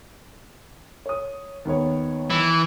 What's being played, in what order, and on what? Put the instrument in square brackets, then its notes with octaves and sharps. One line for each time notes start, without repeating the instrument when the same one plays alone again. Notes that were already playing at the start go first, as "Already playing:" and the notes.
[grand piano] C#5 D#6
D#2 B3 C#5
[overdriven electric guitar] E3